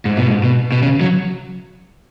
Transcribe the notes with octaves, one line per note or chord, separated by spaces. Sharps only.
G#2
B2
G#2
B2
B2
C#3
F#3